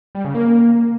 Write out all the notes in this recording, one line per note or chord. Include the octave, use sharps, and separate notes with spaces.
G3
C#3
A#3